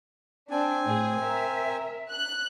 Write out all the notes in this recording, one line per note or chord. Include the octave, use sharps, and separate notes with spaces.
C4 D4 G#5
A2 G#4
A#4 E5
F#6